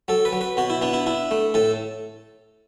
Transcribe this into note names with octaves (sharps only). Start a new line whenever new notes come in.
F#3 A4
B4
F#3
B4
B2 F#4
E4
B3 D4
E4
D4 E4
A3
A2 A4